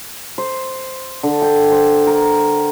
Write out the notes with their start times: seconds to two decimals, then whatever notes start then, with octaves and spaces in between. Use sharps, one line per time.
0.38 C5
1.23 D3
1.42 G5
1.72 C5
2.07 A#4